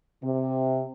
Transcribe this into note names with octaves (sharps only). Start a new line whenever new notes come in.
C3